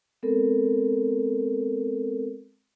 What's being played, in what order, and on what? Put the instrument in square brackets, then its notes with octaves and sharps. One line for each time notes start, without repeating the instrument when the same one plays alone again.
[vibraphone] G#3 B3 C4 A4 A#4